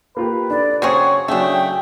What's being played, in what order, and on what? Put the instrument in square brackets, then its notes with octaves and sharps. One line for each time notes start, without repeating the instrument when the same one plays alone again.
[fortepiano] A#3 F4 G4 [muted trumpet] B4
[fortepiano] D4 A4 [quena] D5
[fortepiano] C#3 C5 [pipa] F#3 C4 G#4 [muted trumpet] C#5 [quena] C#6
[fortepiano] C#3 F#3 [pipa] A3 D4 [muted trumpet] G#4 [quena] G5